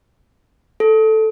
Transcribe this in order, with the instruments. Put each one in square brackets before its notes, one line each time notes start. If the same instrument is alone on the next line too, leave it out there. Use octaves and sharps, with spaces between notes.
[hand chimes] A4